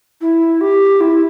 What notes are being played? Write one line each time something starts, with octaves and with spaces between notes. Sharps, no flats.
E4
G4
E4